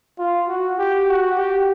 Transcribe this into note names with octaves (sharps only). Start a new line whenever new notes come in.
F4
F#4
G4
F#4
G4